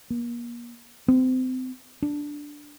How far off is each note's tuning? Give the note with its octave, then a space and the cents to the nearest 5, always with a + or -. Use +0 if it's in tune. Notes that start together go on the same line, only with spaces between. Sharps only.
A#3 +35
C4 -30
D4 +0